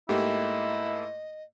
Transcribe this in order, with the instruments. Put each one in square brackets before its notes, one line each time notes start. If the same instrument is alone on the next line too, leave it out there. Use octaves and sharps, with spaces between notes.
[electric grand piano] G#2 A3 A#3 [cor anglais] E4 [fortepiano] G4 [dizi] D#5